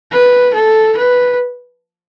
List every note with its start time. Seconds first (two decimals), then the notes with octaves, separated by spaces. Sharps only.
0.12 B4
0.54 A4
0.97 B4